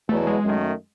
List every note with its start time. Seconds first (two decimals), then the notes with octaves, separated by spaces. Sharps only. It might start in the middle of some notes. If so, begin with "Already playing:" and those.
0.09 E2 B2 F#3 A3 B3 E4
0.27 G#3
0.45 F#2 D#3 A3